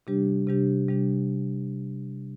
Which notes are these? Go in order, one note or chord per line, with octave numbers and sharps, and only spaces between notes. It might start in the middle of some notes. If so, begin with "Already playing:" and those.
C3 G3 D4 G4
C3 G3 D4 G4
C3 G3 D4 G4